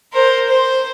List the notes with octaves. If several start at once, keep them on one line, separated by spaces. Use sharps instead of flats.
A#4 C5
C5